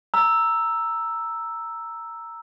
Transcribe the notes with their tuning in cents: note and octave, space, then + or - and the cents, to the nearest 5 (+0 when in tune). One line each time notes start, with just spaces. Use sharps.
A#5 -5 E6 +0